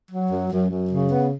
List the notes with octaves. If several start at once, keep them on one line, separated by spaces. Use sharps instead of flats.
F#3
F#2
F#2
F#2
C#3
B3